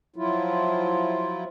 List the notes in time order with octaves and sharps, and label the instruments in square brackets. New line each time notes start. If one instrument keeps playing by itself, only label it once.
[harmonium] F3 F#3 E4 F4